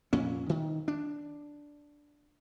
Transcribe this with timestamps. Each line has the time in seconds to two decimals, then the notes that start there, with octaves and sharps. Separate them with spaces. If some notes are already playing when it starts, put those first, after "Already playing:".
0.13 F2 A#2 C#4
0.49 D#3
0.88 D4